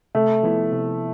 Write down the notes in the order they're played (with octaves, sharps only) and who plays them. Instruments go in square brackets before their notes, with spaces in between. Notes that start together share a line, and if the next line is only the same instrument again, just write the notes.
[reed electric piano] C3 [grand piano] A3
[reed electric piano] F3 B3 E4
C3